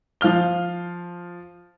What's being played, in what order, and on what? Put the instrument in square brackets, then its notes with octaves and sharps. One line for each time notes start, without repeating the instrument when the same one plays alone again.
[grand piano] F3 F5 F6 G7